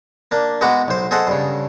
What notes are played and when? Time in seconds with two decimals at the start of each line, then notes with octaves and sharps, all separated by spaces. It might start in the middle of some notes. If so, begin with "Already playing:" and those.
0.31 A#3 D4
0.61 G#3 B3 D#4 F#4 F#5 D6
0.88 B1 C5
1.11 G#4 A4 C5 D#5 F#5
1.27 G2 C#3